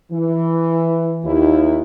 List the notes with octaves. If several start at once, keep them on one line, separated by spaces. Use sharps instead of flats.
E3
D#2 E4